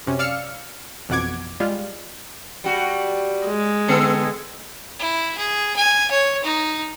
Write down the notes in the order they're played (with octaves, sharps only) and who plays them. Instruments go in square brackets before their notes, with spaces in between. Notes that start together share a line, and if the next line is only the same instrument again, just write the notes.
[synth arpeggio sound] F#2 C3 C#4
D5 F5 E6 F6 C#7
A1 F2 B2 F#5 D6 G#6
G3 G#3 F4
[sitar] G3 F#4
[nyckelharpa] G#3
[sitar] D3 B3 A4
[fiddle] E4
G#4
G#5
C#5
D#4